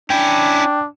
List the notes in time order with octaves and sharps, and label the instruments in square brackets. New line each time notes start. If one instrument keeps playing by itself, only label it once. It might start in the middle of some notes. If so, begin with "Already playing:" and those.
[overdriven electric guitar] C#4 E4 [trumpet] D4 [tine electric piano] G5